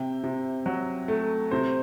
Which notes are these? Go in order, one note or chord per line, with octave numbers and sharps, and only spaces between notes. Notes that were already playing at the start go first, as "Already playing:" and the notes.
Already playing: C3 E5 G5
C3
F#3
A3
C3 C5